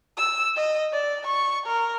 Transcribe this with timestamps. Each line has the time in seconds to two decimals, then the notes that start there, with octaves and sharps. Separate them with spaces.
0.17 E6
0.56 D#5
0.93 D5
1.27 C#6
1.67 A#4